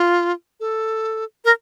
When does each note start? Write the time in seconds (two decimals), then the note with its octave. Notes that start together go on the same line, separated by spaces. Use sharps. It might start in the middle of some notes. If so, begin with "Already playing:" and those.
Already playing: F4
0.60 A4
1.45 A#4